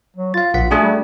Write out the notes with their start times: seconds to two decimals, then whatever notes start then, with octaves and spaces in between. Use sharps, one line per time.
0.17 F#3
0.34 F4 F5 A6
0.54 A#1 F#5 B6
0.71 A3 D4 F#4 G#4
0.84 G3